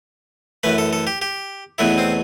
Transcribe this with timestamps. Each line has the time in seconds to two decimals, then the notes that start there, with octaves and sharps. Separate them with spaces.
0.63 F#2 E3 A3 B4
0.78 A4
0.93 A4
1.07 G4
1.22 G4
1.78 E2 B2 F#3 A3 E4
1.98 C4